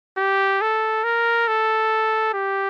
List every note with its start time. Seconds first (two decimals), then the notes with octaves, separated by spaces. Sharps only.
0.18 G4
0.61 A4
1.04 A#4
1.48 A4
2.34 G4